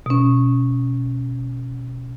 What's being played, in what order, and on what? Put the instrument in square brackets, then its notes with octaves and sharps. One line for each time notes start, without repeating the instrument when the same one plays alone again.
[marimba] B2 C#4